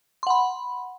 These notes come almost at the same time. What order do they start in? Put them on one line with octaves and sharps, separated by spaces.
C6 F#5 B5